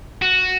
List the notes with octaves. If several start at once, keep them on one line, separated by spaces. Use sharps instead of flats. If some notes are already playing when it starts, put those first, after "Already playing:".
F#4